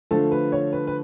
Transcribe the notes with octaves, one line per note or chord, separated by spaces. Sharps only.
D3 F3 A3 A4
B4
C#5
B4
B4